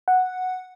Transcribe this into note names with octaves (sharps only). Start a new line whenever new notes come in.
F#5